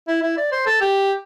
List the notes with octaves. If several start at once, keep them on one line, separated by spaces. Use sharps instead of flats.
E4
E4
D5
C5
A4
G4